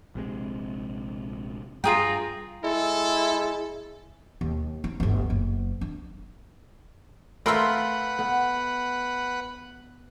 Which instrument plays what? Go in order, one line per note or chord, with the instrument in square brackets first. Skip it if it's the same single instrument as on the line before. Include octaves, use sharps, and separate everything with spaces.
[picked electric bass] A#1 C3 G#3
[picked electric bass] G2 G3 [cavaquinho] F4 G#4 G5 [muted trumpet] A#5
[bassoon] G#3 [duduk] E4 [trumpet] A4
[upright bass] D#2
D#4
G1 D2
F#1
D4
[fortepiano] A3 C6 E6 [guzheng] F4 A#4 [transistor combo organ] B4 F#5
[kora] B3